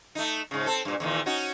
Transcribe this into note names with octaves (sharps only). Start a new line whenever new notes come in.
A3 D#4
G#2 C#3
C4 A4
G2 A#2
E2 A#2 D#3
C#4 D#4 F#4